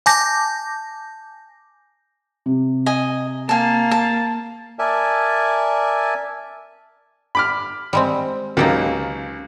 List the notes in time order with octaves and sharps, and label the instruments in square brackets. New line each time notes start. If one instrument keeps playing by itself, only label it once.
[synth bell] G#5 A5 D6 G6 A#6
[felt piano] C3
[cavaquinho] D#5 G#5
[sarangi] A#3 [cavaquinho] G#5 A5
[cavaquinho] A5
[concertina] A#4 D5 E5 G#5 A5
[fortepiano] B5 D6 F6
[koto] G3 G#3 C4
[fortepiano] C#2 F#3 A#3 [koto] D#4 G4 A4